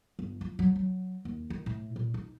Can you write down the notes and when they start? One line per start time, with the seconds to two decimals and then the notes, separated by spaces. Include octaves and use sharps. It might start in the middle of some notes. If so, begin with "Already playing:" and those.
0.19 G1
0.41 F3
0.59 F#3
0.76 F#3
1.25 D#2
1.50 D#3
1.66 A2
1.96 A#2
2.14 D#4